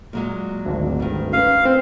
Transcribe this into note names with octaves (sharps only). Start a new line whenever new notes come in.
A#2 F#3 G#3
G#1 D2
G2 D#3
C#4 B4 F5
C4 C5